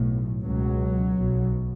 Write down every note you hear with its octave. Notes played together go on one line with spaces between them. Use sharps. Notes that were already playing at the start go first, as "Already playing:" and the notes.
Already playing: B1 A2
C#2 B2 F#3
B1 B2